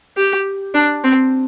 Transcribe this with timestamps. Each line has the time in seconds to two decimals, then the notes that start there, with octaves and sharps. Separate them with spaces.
0.17 G4
0.75 D4
1.04 C4